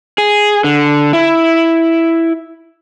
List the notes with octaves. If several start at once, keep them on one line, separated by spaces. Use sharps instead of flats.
G#4
D3
E4